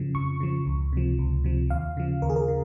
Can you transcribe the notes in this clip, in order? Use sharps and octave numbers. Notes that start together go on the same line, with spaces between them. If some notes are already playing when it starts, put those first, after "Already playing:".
Already playing: F2 C#3 F3
F2 C#6
C#3 F3
C#2
C3 F3
C#2
C3 F3
D#2 F5
C#3 F3
D#2 A#4
G#4
A#4
C#3